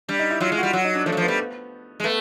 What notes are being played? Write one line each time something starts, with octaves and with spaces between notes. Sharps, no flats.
G3 D4
D#4
E4
F#3 F4
G#3
F#4
G3
F#3 F#4
D#4
D4
F3 A3
F#3
F3
B3
G3
G#3
A3 B3